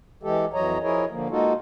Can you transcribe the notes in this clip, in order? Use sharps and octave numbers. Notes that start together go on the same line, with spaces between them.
E3 G#3 G4 A4
F2 E3 F#3 C#5 D#5 A#5
F3 E4 G#4 A#4 C#5 D#5
D3 F3 A#3
G#3 A#3 D#4 F4 F#4 A4